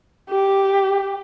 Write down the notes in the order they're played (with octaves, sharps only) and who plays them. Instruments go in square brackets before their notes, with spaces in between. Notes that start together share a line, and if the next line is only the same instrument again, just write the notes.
[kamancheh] G4